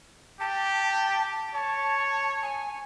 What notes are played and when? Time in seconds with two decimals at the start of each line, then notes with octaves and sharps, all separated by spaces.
0.40 G4 A5
1.54 C#5 A5
2.43 G#5